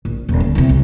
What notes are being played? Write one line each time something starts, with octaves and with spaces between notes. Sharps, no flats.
A#1
D#1
D2
E2 C3
C2